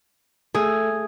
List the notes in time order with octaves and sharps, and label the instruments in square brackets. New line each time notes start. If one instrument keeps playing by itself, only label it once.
[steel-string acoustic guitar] A3 [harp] G#4